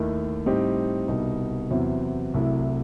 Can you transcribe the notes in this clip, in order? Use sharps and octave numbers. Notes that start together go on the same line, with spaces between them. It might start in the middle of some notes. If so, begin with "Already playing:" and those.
Already playing: D#2 D#3 A3 E4
A2 G3 C4 D#4 G4
C2 B2 G3 D#4
E2 C3 F#3 C4 E4
C2 C3 F#3 A3 E4